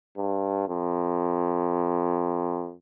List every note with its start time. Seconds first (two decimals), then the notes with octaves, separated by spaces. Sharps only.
0.17 G2
0.68 F2